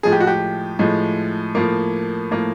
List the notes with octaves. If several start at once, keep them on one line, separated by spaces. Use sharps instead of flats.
A2 F3 G#3 G#4
G4
F#4
G4
A2 F3 G#3
A2 F3 A#3
A2 F3 A#3